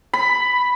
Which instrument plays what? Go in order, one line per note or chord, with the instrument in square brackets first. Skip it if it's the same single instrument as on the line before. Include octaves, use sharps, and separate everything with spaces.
[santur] B5